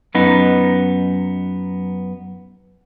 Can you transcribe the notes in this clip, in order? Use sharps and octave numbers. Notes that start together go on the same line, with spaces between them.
F#2 B3 D#4 B4